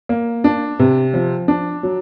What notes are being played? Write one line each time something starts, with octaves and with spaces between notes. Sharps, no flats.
A#3
D4
C3
F3
D4
F#3